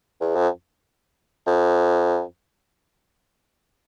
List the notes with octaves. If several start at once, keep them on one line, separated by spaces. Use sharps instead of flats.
E2
F2
F2